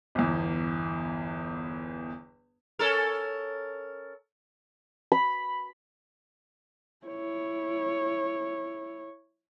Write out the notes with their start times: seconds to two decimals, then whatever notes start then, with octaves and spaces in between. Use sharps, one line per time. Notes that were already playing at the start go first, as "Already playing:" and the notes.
0.15 G1 E2
2.79 C#4 A4 A#4
5.12 B5
7.06 E4 C#5